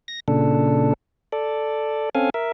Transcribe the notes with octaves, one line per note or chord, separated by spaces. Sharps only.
A#6
A#2 C#3 D4 A4
A4 D5
C4 C#4 A4 F5 G#5
A#4 E5